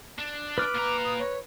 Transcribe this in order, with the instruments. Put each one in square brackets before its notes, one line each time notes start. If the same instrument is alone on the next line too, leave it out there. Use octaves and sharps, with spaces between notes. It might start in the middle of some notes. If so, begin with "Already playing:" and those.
[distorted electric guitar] D4
[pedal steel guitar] B4 F6 [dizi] D6
[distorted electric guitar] A#2 A#5
[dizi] D#6
C#5